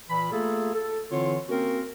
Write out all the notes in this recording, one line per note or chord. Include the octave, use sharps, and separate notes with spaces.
A#2 E3 B5
A3 A#3 F4 G#4 A4
A4
D3 E3 C4 E4 F4 C#5
A#3 C4 C#4 F#4 A#4